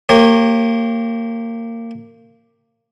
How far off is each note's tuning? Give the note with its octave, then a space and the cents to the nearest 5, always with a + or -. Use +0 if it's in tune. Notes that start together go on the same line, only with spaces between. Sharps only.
A#3 -25 G4 +0 C#5 -35